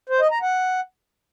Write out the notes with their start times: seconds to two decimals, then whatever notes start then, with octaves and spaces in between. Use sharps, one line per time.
0.09 C5
0.20 D#5
0.31 A#5
0.42 F#5